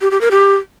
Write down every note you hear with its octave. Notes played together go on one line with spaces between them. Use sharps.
G4
G4
A#4
G4